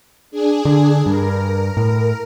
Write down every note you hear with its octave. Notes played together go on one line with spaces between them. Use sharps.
D4 G#4
D3
G2 A#4
A2